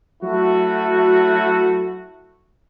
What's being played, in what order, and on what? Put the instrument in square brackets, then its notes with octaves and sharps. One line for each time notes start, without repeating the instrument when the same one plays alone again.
[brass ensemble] F#3 A3 E4 F#4